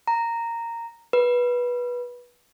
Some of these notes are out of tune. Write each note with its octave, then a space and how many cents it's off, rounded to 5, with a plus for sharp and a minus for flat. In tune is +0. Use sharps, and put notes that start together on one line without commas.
A#5 -10
B4 -15